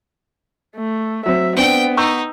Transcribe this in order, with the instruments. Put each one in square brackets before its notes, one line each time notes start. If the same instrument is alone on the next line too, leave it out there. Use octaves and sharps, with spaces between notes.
[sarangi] A3
[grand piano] F#3 C4 [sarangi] E5
[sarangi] B3 [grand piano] C4 D4 [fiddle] G5
[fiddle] D#4 [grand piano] C#6 E6 G6